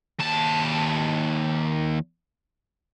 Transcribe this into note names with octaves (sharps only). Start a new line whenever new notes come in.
D#2 A5